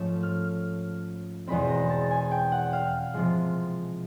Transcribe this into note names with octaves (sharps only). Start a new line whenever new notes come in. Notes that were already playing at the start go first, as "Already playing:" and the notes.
Already playing: G#2 F3 A3 C#4 E6
F6
E2 B2 G#3 C4 B5
A#5
A5
G#5
G5
F#5
F5
C3 F3 G#3